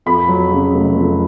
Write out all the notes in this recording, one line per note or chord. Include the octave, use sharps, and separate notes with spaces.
F2 B5
F#3
C#3
F1
F2